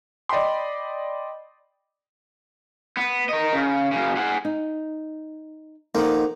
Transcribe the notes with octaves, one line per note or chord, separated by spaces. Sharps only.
D5 D#5 G5 B5 C6
B3
A#4 D#5
C#3
F#2 C#3
G#4 F#5
D#4
F2 A#3 D#4 F#5